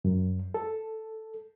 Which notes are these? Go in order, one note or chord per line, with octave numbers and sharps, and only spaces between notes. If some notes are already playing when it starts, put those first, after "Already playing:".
F#2
A4